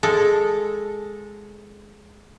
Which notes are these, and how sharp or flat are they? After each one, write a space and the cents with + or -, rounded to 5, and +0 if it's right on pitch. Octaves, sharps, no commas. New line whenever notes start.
G#3 +0 A4 +0